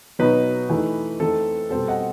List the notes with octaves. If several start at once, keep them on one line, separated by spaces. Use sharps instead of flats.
B2 F#3 B3 D#4 B4
E3 A3 D#4
E3 A3 C4 D#4 A4
B2 G3 C4 A4 C5
D#5 F#5